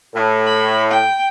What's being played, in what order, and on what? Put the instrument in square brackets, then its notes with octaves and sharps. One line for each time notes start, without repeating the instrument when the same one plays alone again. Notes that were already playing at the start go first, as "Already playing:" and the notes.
[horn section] A2
[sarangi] B5
G5